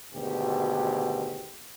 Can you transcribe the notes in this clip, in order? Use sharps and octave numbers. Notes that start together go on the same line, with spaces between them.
G#1 D2 B2 G4